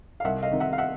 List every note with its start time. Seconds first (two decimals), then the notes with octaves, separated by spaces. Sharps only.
0.20 F5
0.24 C2 E5 F#5
0.42 D#5 F5
0.51 C3 D#3
0.60 E5 F#5
0.73 F5
0.78 E5 F#5